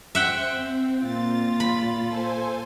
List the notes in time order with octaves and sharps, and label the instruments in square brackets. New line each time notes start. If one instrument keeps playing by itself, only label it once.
[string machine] C5 [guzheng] E5 F#5 G5
[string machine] C4
[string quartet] A#2 F4 [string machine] A6
[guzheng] B5
[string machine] A4 C5 G#5